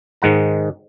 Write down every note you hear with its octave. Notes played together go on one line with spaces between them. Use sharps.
G#2 D#3 G#3 F#5 A#5